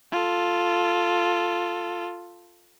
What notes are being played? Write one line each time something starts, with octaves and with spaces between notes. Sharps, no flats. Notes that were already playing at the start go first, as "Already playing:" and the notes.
F4 A4